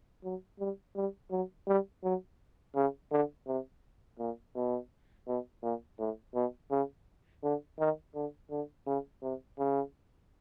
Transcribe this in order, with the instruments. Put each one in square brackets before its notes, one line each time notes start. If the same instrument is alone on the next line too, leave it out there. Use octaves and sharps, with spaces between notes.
[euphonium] F#3
G3
G3
F#3
G3
F#3
C#3
D3
C3
A#2
B2
B2
A#2
A2
B2
C#3
D3
D#3
D3
D3
C#3
C3
C#3